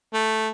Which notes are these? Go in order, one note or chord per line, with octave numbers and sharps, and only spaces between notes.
A3